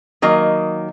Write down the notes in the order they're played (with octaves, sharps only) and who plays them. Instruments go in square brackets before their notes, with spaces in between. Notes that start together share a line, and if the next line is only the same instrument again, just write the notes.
[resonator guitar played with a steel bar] D#3 F#3 A#3 D#5